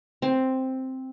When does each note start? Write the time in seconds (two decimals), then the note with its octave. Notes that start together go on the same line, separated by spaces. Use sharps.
0.22 C4